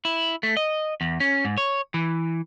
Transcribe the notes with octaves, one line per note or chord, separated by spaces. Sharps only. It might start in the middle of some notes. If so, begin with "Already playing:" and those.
E4
A3
D#5
E2
C#4
G#2
C#5
E3